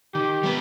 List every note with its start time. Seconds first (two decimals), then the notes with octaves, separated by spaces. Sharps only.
0.14 D#3 G4
0.43 G3 B3